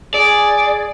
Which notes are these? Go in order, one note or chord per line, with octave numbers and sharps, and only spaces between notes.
G#4 D5